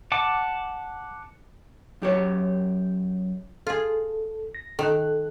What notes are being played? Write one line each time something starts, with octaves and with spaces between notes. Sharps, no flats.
F#5 A5 D6
F#2 G4 C#5
F4 G#4 A4
A#6
D#3 A4 F#6